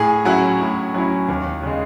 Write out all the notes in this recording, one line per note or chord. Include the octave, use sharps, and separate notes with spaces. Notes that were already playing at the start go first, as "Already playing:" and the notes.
Already playing: A2 G#4
F#3 C#4 E4 F#4
A2
F#3 C#4 E4
D#2
C#3 G#3